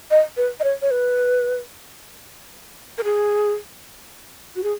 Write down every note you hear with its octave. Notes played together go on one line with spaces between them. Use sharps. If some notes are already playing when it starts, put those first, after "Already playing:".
D#5
B4
D#5
C#5
C#5
B4
A#4
G#4
F#4
G#4